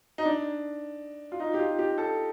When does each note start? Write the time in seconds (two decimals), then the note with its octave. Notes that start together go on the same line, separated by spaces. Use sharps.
0.18 D#4
0.25 D4
1.32 F4
1.40 D#4
1.54 G4
1.59 F4
1.79 G4
1.98 A4